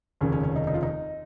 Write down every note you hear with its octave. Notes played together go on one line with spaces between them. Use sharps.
F1 D#2 C#3 C#4
C#4
C#4
D#4
D#4
F4
D#4